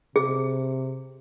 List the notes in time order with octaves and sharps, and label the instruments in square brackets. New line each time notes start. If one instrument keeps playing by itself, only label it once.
[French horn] C3 [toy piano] G#4